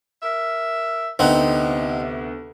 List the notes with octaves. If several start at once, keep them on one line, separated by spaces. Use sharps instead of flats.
A#4 E5
D2 C3 B3 C4 D#4 F#6